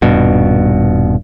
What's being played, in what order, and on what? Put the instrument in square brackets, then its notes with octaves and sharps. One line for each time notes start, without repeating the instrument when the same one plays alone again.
[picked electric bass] D#1 G2 B2